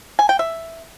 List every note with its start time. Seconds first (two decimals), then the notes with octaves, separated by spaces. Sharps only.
0.19 G#5
0.29 G5
0.39 E5